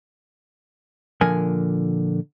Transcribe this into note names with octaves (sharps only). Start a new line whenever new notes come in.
A#2 D3 F3 A#4 G#5